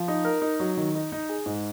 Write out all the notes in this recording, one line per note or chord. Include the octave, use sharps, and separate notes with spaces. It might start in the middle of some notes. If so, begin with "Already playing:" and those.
Already playing: F3
D#4
A#4
D#4
F#3
D#3
D#4
D#4
G#4
G#2